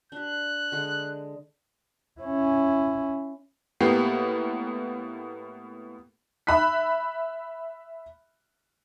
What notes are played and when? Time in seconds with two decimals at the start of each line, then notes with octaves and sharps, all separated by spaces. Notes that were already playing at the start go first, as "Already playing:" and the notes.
0.12 D4 G4 F#6
0.72 D3 G#3
2.21 C#4 E4
3.80 A2 A#3 B3 G4 C7
6.47 E5 B5 F#6 B6